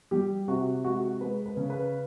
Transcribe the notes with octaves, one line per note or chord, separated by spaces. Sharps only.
G3 G4
C3 F#4
G#3 F#4
G#3 B4
B4
C#3
B4